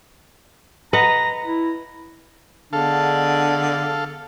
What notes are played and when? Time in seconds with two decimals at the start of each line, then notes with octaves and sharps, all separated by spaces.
0.93 B4 D#5 F#5 A#5
1.45 E4
2.73 D3 G#3 B3 D4 A4 F5